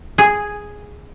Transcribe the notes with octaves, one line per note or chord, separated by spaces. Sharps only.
G#4